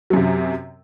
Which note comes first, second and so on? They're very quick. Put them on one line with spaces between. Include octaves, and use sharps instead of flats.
F#3 F#2 C3